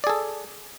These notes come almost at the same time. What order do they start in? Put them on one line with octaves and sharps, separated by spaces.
D5 G#4 A4